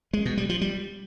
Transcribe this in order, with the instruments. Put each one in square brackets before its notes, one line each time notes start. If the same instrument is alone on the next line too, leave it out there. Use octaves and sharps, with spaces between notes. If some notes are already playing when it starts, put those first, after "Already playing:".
[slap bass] G#3
B2
G3
F3
G3